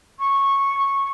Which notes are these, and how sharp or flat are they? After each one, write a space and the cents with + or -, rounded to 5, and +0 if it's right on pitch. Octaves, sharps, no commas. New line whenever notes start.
C#6 -10